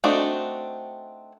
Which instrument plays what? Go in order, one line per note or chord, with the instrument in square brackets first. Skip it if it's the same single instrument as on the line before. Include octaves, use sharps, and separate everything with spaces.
[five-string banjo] A3 C4 D4 D#4 F#4